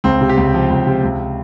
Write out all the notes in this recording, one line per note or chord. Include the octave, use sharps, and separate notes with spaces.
C#2 C4
C3
G4
C#2
F3
C#2
C3
C#2
C3